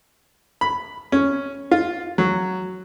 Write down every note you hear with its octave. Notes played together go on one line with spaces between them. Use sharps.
B5
C#4
F4
F#3